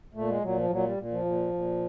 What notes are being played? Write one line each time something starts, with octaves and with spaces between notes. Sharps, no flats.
A#2 A3
G#3
A#2 F#3
F3
A#2 F#3
G3
A#2
F3
A#2
A#2